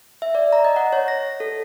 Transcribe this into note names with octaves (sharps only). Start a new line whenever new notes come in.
E5
D5
A#5
D#5
F#5
C#5
A#6
A4